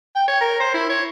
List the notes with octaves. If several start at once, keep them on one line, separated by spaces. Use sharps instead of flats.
G5
C#5
A#4
C5
E4
C#5